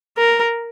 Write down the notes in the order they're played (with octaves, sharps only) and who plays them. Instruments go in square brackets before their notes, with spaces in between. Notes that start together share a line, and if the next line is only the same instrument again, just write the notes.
[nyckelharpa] A#4